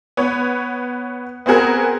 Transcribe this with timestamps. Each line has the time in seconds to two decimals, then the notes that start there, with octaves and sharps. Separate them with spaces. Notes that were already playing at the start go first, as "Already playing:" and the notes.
0.17 B3 C#5
1.46 B3 C4 F#4 G#4 A#4